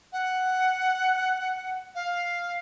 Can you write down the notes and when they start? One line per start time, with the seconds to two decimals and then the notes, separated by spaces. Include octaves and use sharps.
0.13 F#5
1.95 F5